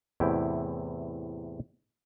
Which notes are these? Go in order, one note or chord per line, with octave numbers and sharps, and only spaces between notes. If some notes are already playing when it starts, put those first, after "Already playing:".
E2 A2 C3 E4 G5